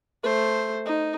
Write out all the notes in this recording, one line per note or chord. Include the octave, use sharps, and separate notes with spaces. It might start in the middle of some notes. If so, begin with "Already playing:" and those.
A3 C5
D#4